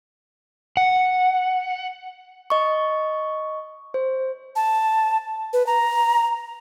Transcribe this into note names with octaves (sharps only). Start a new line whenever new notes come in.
F#5
D#5 C#6
C5
A5
B4
A#5